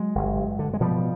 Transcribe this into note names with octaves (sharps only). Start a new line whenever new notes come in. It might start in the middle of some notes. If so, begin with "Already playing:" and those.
Already playing: F#3 G#3
G1
G2
D3
G#3
B2 F3 G3